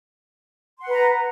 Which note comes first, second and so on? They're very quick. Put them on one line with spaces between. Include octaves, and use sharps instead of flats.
C6 F#5 B4 A#5